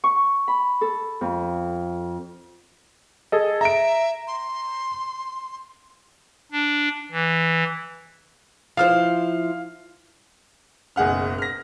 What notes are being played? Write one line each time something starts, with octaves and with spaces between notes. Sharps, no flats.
C#6
B5
A4
F2
G#4 A4 D#5
E5 A#5 D7
C6
D4
E3
F3 E4 C5 F5 F6
F#1 B1 G#4 F#5 F6
F6 A#6